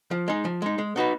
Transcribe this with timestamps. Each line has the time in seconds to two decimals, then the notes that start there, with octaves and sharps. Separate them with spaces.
0.11 F3
0.28 G#3 D#4
0.45 F3
0.62 G#3 D#4
0.78 G#3
0.96 B3 D#4 F#4 B4